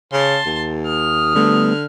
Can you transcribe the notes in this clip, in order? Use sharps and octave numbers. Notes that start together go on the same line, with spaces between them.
C#3 A5 C6
D#2
D#6 F6
D3 G3 A3 B3